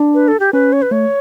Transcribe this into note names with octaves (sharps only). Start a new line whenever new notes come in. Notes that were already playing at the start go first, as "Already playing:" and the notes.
Already playing: D4
B4
A4
G4
C#4 B4
C#5
B4
A3 C#5